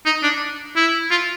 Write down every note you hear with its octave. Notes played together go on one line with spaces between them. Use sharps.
D#4
D4
E4
F4